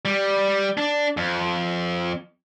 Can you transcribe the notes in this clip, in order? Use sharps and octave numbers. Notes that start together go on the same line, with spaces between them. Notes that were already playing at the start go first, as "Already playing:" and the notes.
G3
D4
F2